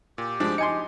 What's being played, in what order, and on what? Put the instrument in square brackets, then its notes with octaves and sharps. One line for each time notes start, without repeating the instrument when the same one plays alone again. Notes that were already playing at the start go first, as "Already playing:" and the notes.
[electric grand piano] A#2 [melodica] G4
[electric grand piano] F3 G#3 [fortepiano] D4
[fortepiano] D#4 G#5 C6 [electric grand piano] C#7